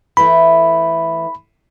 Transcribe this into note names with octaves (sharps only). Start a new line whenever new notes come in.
E3 A3 B5